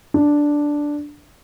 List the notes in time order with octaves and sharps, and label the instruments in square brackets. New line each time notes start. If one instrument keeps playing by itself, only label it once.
[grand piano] D4